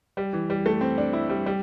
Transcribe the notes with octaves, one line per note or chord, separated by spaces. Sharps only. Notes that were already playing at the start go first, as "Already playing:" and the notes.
G3
E3
G3
A3
C4
D4
E4
G3
G3